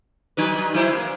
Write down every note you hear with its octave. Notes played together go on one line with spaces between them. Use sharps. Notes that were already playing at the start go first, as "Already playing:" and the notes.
F#3 D#4 B4
F#3 E4 C5
A#3